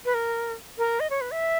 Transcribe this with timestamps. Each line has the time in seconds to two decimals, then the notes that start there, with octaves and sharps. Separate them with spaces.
0.05 B4
0.14 A#4
0.78 A#4
1.00 D#5
1.10 C#5
1.21 B4
1.31 E5